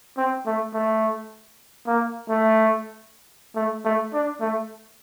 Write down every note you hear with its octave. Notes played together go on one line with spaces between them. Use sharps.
C4
A3
A3
A#3
A3
A3
A3
D4
A3